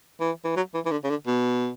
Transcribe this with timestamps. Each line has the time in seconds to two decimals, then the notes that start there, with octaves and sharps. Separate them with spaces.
0.20 E3
0.44 E3
0.56 F#3
0.74 E3
0.85 E3
0.91 D3
1.04 C#3
1.10 D3
1.27 B2